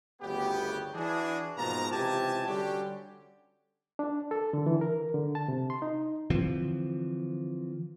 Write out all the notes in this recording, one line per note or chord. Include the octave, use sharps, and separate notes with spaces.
G1 D2 C#3 B3 G4
E3 D4 F#4 G#4
G#2 B2 F3 A#3 A5 A#5
C#2 C3 E3 G4 G#5 A5
D3 G3 C#4 F#4 G4
D4
A4
D3
E3
A#4
D3
A5
C3
C6
D#4
D3 E3 F3 C4